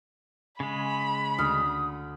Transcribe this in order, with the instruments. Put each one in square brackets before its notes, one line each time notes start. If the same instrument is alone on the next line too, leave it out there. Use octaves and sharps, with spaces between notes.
[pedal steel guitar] C#3 G#3 [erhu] B5
[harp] D2 F6 [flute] D#6